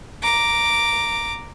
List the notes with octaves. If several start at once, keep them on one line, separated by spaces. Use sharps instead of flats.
A#5 D6